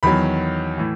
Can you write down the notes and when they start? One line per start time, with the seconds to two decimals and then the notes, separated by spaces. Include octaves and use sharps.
0.03 E2 D#3 F#3 B5
0.78 A2 E3